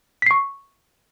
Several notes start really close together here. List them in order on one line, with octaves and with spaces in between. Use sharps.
B6 C7 C#6